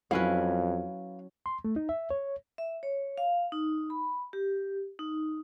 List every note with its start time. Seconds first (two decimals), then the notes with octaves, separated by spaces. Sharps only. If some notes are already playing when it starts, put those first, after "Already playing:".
0.11 F2 F#3 C#4 E4 B4 F5
1.46 C6
1.65 A3
1.76 D#4
1.89 E5
2.10 C#5
2.58 E5
2.83 C#5
3.18 F5
3.52 D#4
3.90 B5
4.33 G4
4.99 D#4